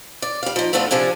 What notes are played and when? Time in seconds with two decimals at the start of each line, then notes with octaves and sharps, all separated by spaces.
0.22 D5
0.43 G3 F5
0.56 F3 D#4
0.73 A3 B3 C4 D4 F4
0.91 C3 F3 D4 G#4